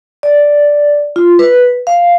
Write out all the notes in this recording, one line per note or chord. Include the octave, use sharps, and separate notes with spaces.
D5
F4
B4
F5